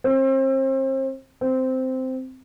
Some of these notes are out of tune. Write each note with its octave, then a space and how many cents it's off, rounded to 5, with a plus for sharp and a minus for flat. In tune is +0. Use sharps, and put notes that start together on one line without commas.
C4 +35
C4 -10